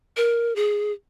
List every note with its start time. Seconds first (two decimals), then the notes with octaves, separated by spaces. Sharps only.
0.17 A#4
0.56 G#4